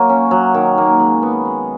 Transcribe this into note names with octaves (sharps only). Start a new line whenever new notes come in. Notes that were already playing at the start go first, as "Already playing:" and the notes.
Already playing: F#3 A#3
C#4
F#3
D#3
A#3
G#3
B3
G#3